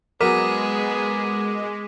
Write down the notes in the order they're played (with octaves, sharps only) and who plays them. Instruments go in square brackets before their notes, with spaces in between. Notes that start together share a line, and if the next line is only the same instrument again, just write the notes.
[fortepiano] F#3 A#4 [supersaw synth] G#3 [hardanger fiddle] B3 G#4 [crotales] D6 B6 D#7